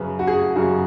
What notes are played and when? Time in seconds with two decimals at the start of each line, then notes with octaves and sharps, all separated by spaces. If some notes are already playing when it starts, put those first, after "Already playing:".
Already playing: F#2 C#3 B4
0.19 F#4
0.27 G#4
0.56 F#2 C#3 F#4